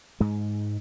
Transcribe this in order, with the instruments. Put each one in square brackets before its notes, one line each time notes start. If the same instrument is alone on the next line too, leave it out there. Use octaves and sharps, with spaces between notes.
[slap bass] G#2 G#3